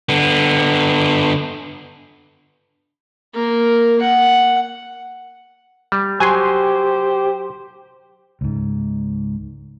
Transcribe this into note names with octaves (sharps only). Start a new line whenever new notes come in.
D3 B3
A#3 A#4
F#5
G3
F#3 G4 C5 G#5 C6
C#2 G#2